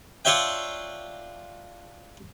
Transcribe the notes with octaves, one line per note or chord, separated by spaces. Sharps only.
D4 F4 C#5 E5 G5